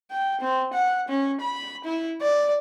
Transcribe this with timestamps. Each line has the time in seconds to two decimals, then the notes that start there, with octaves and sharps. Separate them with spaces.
0.11 G5
0.41 C4
0.73 F#5
1.08 C#4
1.41 B5
1.85 E4
2.21 D5